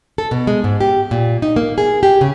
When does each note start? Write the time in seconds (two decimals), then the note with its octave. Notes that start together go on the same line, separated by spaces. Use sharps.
0.18 A4
0.31 B2
0.47 G#3
0.64 G#2
0.81 G4
1.11 A#2
1.42 D#4
1.56 A#3
1.78 G#4
2.03 G4
2.21 C#3